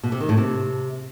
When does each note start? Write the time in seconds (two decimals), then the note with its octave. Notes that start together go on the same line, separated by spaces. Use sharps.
0.03 B2
0.12 C3
0.20 D#3
0.29 A2
0.37 C3